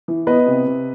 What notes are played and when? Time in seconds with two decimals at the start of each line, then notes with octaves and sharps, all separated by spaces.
0.08 E3
0.27 B3 B4 D#5
0.46 C3
0.66 C3